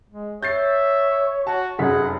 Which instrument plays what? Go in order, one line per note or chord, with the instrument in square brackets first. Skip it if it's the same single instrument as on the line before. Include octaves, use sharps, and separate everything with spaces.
[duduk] G#3
[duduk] C#5 [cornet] E5 [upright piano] G6 A6 C7
[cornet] F#4 [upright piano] A5
[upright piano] F1 F#2 B6 [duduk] G#4 [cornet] F#5